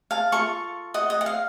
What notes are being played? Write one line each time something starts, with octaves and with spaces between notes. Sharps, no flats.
F5 A5
F4 A4 C#6
D#5 F#5
D#5
F#5
F5